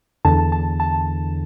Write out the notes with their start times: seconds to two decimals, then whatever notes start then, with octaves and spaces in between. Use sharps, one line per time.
0.25 E2 D3 A5
0.52 A5
0.80 A5